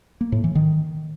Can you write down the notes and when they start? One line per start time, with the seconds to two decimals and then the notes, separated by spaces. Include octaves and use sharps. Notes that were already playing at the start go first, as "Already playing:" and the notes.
0.21 A#3
0.32 A2
0.44 E3
0.55 D#3